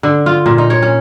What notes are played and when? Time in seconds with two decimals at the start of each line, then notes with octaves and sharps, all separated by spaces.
0.03 D3
0.26 F4
0.46 A#2
0.58 D#4
0.70 C#5
0.82 C#4